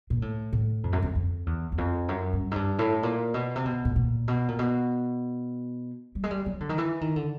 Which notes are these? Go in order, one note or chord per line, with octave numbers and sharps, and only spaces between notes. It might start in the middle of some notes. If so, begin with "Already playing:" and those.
A#2
A2
A2
F2
F#2
F2
F2
E2
E2
F2
F#2
G2
G#2
G2
A2
A#2
B2
C3
B2
A2
A#2
B2
A#2
B2
G3
G#3
G3
F#3
D3
D#3
E3
D#3
D3